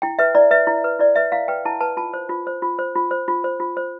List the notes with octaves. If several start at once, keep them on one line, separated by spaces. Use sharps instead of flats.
E4 G5
B4 E5
E4 D5
B4 E5
E4
B4
E4 D5
B4 E5
E4 F5
B4 G5
E4 A5
B4 A5
F4 A5
C5
F4
C5
F4
C5
F4
C5
F4
C5
F4
C5